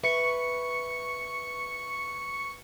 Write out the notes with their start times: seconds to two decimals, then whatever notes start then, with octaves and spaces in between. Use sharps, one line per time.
0.03 B4 E5 C#6 C#7